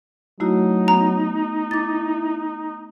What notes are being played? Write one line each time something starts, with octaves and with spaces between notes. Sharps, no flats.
F#3 A3 D#4 E4 F#4
B3 A#5
E4 D6 A6